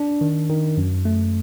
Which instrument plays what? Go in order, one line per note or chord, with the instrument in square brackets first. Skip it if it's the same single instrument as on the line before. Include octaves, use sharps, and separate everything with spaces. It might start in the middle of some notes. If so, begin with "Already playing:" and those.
Already playing: [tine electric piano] D4
D#3
D#3
F#2
A3